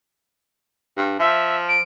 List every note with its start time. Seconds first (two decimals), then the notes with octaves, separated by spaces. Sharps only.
0.97 G2
1.19 F3 E5
1.69 D7